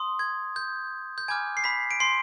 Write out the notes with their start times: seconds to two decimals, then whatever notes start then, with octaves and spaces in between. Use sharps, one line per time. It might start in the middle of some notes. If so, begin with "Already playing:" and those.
Already playing: C6 D#6
0.19 G#6
0.56 G6
1.18 G6
1.28 G#5 B5 D6 F6 G#6
1.57 C7
1.64 B5 B6
1.91 D7
2.00 C6 C7